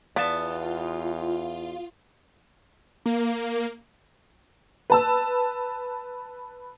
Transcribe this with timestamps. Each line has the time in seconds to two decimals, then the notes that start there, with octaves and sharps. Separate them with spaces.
0.16 E2 B3 F4 D5 F5 A5
3.06 A#3
4.90 B4 A5 E6